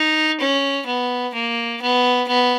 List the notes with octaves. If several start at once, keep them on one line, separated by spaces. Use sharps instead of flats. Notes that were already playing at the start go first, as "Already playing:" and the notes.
Already playing: D#4
C#4
B3
A#3
B3
B3